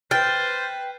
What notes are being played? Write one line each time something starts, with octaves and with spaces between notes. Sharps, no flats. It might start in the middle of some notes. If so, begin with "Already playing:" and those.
B4 C5 G5 F6 A6